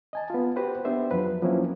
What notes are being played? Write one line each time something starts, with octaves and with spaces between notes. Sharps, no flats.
D#5 G#5 A5
B3 F4
F#4 G4 B4 C5 F#5
B3 D4 G4 C5 E5
F2 F3 F#3 B4
F3 F#3 A#3 C4 C#4 E4